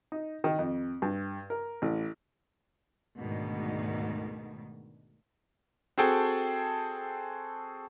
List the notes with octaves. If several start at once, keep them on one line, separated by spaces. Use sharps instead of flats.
D#4
D#3
F2
G2
A#4
A1
D2 G#2 B2 D#3
C4 F#4 G#4 A4 G5 A5